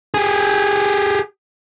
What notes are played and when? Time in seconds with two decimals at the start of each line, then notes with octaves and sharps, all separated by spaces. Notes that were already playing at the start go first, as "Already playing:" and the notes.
0.14 G4 G#4